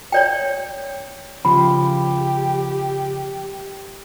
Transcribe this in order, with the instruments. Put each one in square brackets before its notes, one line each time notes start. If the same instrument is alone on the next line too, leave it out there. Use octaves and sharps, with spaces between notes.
[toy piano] C#5 D5 G5
[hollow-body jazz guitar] C#3 F3 [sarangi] G4 [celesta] B5